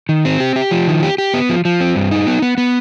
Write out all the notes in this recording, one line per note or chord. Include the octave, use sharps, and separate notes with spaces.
D#3
C4
G4
G4
F3
D#3
G4
G4
B3
F3
F3
C4
G2
D#4
B3
B3
B3